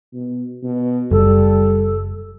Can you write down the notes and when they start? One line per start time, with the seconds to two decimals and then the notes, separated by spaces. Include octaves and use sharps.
0.14 B2
0.63 B2
1.12 F#1 G3 A4